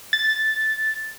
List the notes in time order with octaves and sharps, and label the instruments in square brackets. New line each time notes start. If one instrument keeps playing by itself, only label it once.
[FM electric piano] A6